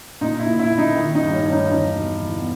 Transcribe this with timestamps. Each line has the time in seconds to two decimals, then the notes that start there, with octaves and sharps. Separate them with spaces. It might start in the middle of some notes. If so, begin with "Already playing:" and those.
0.21 A#2 D#4
0.39 E4
0.47 A#2
0.59 E4
0.71 A#2
0.78 D#4
0.96 D#3 E4
1.15 D#4
1.21 G2
1.34 C#4
1.46 G2
1.52 D#4
1.71 E2 D#4
1.96 B2
2.21 E2
2.38 B3